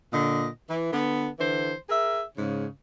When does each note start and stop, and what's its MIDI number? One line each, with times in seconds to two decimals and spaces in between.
0.12 0.47 46
0.12 0.47 50
0.12 0.47 75
0.68 0.91 52
0.91 1.27 50
0.91 1.27 59
1.39 1.72 50
1.39 1.72 52
1.39 1.72 72
1.88 2.21 68
1.88 2.21 70
1.88 2.21 76
2.37 2.66 44
2.37 2.66 49